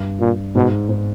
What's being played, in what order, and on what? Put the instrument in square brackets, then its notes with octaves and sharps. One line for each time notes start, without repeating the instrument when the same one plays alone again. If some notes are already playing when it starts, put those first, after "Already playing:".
Already playing: [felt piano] G2
[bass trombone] A#2
[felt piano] G#2 [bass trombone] B2
[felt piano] G#2